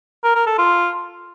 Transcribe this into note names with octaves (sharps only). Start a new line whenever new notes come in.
A#4
A#4
A4
F4